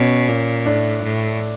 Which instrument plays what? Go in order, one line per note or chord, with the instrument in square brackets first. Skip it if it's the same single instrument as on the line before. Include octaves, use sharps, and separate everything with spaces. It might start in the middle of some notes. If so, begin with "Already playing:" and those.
Already playing: [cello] B2 [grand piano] C#4
[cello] A#2
[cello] A2 [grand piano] D4
[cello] A2